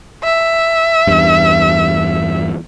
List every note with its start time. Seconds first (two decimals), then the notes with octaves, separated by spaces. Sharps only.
0.24 E5
1.07 E2 G2